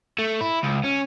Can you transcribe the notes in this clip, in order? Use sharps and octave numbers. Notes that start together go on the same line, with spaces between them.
A3
E4
C#2
C#4